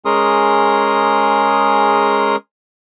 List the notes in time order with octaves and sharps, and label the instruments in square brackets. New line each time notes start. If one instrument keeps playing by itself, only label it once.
[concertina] G#3 C#4 G#4 A#4 C6 D#6